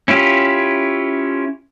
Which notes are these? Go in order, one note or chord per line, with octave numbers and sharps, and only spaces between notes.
C#4 E4 F4 G4